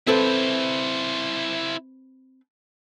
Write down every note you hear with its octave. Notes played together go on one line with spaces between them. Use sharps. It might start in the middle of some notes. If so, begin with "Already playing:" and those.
C4 E4 A4 B4 C5